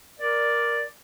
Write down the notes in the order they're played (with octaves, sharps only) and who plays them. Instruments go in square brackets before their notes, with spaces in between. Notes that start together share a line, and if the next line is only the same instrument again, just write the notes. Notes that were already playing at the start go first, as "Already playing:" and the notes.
[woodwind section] A#4 D5